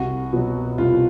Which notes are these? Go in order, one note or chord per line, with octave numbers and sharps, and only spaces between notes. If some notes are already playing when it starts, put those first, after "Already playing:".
Already playing: C2 F#4
B2 F#3
C2 F4